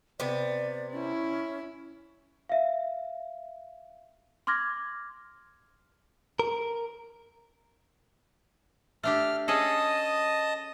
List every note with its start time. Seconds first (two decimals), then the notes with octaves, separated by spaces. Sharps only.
0.20 C3 B3 D5
0.92 C#4 E4
2.49 E5 F5
4.47 C6 D6 F6 G#6 A#6
6.39 A#4
9.03 A3 D4 G4 F6
9.48 C#4 G#4 A4 D#5 A5 D#6